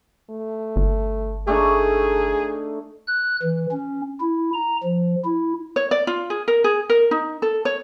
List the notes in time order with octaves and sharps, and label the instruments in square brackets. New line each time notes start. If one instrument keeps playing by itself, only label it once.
[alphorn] A3
[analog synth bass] G1
[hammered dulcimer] A3 D4 D#4 [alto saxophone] G#4 [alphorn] A4
[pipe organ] F#6
E3
C#4
E4
A#5
F3
E4
[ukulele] C#5
D5
F4
G#4
A#4
G#4
A#4
D#4
A4
C#5